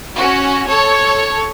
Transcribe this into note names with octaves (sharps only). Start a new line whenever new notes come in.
C#4 F#4
A4 C#5